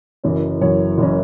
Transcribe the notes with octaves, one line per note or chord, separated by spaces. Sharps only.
F#1 F#2 E3 C#4
F#1 F#2 E3 C#4 C#5
F#1 E3 C#4